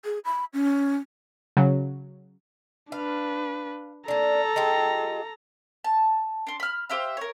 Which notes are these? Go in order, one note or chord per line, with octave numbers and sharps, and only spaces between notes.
G#4
B5
C#4
C#3 F#3
D4 B4 F5
A#3 D4 A4 A#5
G#3 F4 G4
A5
D4 C6
B5 F6
G4 C5 E5 F5
A#4 C#5